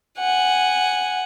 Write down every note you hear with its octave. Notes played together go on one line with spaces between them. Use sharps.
F#5 G#5